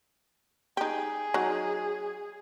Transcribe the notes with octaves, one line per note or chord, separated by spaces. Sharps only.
D#4 G4 G#4
F#3 D#4